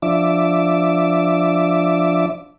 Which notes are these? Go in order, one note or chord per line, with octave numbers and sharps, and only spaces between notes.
F3 D4 E5 D6